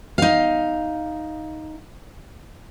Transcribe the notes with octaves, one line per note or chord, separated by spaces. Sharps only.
D#4 F5